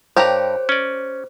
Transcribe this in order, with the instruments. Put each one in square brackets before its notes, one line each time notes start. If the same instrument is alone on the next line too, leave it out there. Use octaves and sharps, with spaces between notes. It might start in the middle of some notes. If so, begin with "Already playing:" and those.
[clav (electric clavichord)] G2 A#5 [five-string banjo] G4 A#4 C#5 [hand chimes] C5
[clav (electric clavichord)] C#4 D5